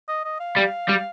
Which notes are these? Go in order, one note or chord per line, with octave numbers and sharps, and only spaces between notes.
D#5
D#5
F5
G3
G3